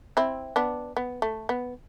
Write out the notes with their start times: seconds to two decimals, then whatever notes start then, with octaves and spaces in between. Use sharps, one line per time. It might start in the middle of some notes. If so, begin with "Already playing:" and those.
0.17 C4 E4
0.56 B3 D4
0.97 B3
1.22 A3
1.49 B3